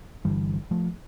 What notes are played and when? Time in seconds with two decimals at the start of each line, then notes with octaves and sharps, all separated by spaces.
0.24 G1 G2 D3 E3 G3
0.71 F3 A3